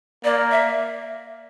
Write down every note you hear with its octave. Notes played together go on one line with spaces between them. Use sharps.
A#3 D5
E5